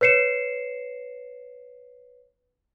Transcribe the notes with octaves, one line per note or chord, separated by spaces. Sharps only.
B4 C#5 C7 C#7 E7